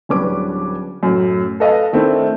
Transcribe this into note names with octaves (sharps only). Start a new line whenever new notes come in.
D1 G3 C#4 D4 B4 D6
F#2 A2
A4 B4 D#5 F5 A5
D#3 A3 C4 D4 E4